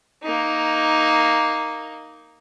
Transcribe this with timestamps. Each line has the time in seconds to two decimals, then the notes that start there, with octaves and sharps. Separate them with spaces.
0.23 A#3 D#4